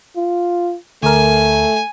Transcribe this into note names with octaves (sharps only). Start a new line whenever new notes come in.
F4
D2 A3 A#4 G#5